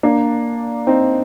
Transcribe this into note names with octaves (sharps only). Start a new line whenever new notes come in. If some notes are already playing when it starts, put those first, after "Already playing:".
A#3 D4
C4 D#4